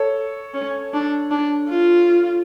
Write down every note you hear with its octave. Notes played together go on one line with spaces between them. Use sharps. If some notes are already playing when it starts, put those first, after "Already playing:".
Already playing: A4 C#5
C#4
D4
D4
F4